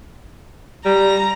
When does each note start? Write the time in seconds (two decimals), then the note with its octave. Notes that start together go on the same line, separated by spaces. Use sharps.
0.85 G3 A#5